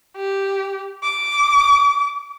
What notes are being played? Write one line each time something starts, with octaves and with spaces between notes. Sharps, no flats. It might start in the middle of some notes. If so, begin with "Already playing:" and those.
G4
D6